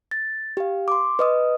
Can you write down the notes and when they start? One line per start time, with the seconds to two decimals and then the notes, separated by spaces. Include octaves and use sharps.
0.11 A6
0.57 G4 F5
0.88 C6 D6
1.19 B4 D#5 D#6